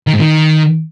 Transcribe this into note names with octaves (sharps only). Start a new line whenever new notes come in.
D#3
G#2
D#3